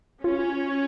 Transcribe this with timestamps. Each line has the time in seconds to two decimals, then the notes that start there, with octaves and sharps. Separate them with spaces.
0.24 C#4 F4